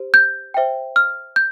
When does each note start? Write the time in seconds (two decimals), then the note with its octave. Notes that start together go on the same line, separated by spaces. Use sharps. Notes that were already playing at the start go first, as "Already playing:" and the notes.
Already playing: G4 C5
0.14 G6
0.54 C5 E5 G5
0.96 F6
1.36 G6